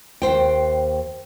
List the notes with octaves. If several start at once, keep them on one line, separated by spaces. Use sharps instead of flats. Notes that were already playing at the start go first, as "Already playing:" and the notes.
D#2 G#2 C5 G5